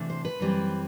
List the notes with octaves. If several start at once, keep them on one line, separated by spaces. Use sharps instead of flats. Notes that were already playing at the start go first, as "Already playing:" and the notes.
Already playing: C3 E3 A3 D4
C5
B4
F#2 E3 G3 C4